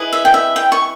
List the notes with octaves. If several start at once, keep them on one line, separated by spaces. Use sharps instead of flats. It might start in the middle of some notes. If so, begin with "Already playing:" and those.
Already playing: E4 G#4 B4 D#5
E5
G5
E5
G5
C#6